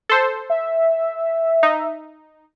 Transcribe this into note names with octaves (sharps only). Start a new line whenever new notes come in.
A4 C5
E5
D#4